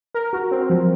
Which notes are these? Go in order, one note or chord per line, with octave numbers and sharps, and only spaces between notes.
A#4
F#4
C4
F3